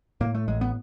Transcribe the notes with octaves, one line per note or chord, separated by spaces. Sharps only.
A2 A#3
A3
A1 G#3
B3